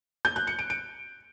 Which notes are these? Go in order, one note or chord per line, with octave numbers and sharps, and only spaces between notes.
G6
F#6
C#7
D7
D7